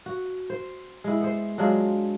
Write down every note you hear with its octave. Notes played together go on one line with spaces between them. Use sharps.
F#4
C5
G#3 E4
B3 C5
F#3 G#3 D4 F4